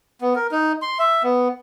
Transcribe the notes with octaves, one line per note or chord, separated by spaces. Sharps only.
B3
A#4
D#4
C6
E5
B3